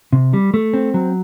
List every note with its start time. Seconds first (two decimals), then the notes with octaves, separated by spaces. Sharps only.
0.13 C3
0.34 G3
0.54 A3
0.74 C4
0.94 F#3